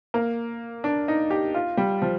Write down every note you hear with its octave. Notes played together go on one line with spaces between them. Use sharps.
A#3
D4
D#4
G4
F4
G3
F3